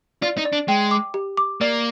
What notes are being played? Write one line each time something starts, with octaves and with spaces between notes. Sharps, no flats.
F4 D5
D#4
D5
D4
G#3 G5
D6
G4
D6
A#3 D5